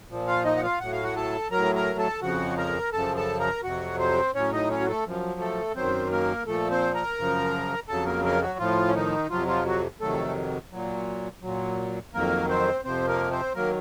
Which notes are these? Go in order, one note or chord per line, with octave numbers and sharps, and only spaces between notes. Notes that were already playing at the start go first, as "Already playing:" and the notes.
A#2 F3
F4 F5
D#4 D#5
F#5
F4 F5
A2 F#3 F#5
F5
F#4 F#5
A4 A5
A2 F#3 A#4 A#5
A#4 A#5
A4 A5
F2 C#3 F3 F#4 F#5
A#4 A#5
F#2 C#3 F3 A4 A5
A4 A5
A#4 A#5
F2 C3 F#3 F#4 F#5
C4 C5
A2 F#3 C#4 C#5
D#4 D#5
C#4 C#5
F#4
A3 A4
F#2 F3
A3 A4
F#2 D#3 F#3 C4 C5
A#3 A#4
A#2 F3 A3 A4
C4 C5
A#4 A#5
F#2 C#3 F3
F2 C#3 F#3 A4 A5
A#3 A#4
A#3 A#4
F#3 F#4
A2 F3 F4
C#4
D#3 D#4
F2 C3 F3 F#3 F4
F3 F4
F#3 F#4
F2 C3 D#3 F#3 A3 A4
A#2 F#3
A#2 F#3
F2 D#3 F#3 A#3 A#4
C4 C5
F2 C3 F3 C4 C5
A#3 A#4
C4 C5
D#3 F#3 A#3 A#4